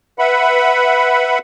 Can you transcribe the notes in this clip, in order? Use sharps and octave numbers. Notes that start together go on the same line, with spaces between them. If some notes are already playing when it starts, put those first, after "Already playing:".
B4 E5 F#5 B5